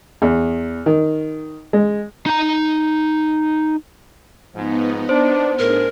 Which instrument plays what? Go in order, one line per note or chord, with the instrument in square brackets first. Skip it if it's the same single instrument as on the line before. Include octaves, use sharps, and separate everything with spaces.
[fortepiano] E2
D#3
G#3
[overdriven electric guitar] D#4 A#5
[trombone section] G#2 F3 [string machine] B3 D#4
[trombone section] D4 [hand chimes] C5
[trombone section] A2 [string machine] D4 G#4 [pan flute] A#4